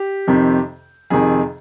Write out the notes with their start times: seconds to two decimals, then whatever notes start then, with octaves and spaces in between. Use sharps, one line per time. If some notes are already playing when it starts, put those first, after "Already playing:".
Already playing: G4
0.27 F2 C3 D#3
1.10 F2 C3 D#3 G#4